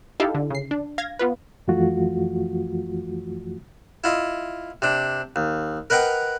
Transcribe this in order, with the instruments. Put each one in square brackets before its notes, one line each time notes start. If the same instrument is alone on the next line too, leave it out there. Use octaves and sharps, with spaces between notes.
[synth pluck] D#4 E4 G4 A4 E5 F5
D3
C#3 C7
D4
F5 G#6 A#6
B3 F4 B4
[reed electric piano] F#2 E3 F3 A3 F4 F#4
[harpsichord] E4 F4 D#5
C3 D4
D#2
A#4 B4 D#5 F#5 G5 A#5